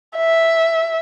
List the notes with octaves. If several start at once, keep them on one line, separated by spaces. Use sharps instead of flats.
E5